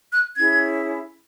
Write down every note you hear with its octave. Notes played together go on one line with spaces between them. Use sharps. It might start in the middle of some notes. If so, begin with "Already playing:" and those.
F#6
C#4 E4 G#4 G#6